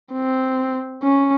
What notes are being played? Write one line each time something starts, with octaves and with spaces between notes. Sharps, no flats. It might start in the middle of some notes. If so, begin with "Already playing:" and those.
C4
C#4